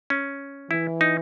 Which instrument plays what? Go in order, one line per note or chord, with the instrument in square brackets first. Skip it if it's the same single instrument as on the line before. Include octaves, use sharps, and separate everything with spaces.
[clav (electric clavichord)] C#4
[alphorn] E3 [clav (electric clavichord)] E4
[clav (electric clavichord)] D#4